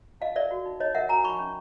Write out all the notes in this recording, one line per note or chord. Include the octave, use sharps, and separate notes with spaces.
D#4 D#5 F5
A#4 D5 E5
F#4
D#4
D#4 C#5 D#5
A#4 E5 F#5
F#4 G#5 A#5
D#4 B5 C#6
C#4